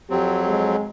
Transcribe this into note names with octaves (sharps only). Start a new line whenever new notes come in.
F2 F#3 C4 G4
G#3